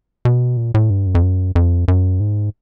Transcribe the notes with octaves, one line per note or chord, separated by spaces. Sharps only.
B2
A#2
A2
G2
F#2
F2
F#2
F2
F#2
G#2